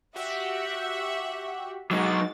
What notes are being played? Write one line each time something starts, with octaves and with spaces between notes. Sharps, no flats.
F#4 G4 E5 F#5
F#3 G#3 D#4 F#4 A6